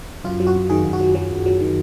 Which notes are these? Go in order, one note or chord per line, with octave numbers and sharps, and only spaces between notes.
F#2 F4
F#3
F#4
F#2
D#3 G#4
F#2
F#4
F#3
F#3
F#2
F#3
D#3